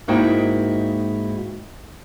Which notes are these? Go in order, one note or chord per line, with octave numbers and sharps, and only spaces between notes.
G#2 A#3 D#4 E4 F#4 G5